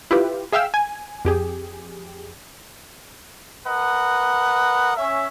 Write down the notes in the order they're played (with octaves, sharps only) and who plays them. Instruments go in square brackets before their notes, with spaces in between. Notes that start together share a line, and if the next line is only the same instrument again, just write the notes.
[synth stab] E4 F4 G4 B4
G#4 E5 F5 G5 E6
G#5
F2 G4 G#4
[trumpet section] A#4 B4 D#5 F#5
C#4 E5